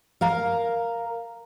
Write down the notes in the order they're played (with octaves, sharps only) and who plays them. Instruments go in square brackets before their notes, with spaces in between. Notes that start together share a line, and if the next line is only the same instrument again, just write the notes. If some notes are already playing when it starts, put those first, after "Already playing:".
[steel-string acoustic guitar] A#4 F5 A#5